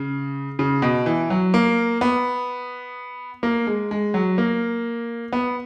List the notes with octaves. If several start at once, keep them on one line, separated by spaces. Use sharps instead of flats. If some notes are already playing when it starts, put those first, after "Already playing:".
Already playing: C#3
C#3
B2
E3
F#3
A#3
B3
A#3
G#3
G#3
F#3
A#3
B3